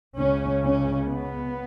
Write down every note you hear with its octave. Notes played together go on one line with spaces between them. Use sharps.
C#2 C#3 C#4
C#4
B3